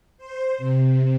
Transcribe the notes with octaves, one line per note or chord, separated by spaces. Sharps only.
C5
C3